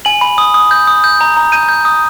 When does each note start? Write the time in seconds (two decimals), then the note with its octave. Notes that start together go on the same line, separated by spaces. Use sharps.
0.05 G#5 F#7
0.21 B5
0.38 D#6
0.54 D#6
0.71 G6
0.87 D#6
1.04 G6
1.21 A#5
1.37 A#5
1.52 G6 D#7
1.69 G6
1.85 D#6